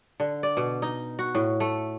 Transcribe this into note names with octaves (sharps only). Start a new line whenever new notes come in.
D3
D5
B2
D#4
F#4
A2
A3